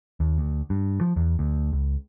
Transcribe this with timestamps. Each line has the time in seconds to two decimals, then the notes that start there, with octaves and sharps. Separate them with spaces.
0.20 D#2
0.38 D2
0.70 G2
1.01 F3
1.16 E2
1.39 D2
1.73 C#2